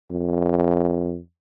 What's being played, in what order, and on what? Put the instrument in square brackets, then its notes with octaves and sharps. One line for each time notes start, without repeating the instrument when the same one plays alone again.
[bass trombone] F2